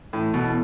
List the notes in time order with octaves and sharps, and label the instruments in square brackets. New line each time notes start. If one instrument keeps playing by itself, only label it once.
[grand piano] A2 [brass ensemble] E3 C#4 E4 A4
[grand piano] B2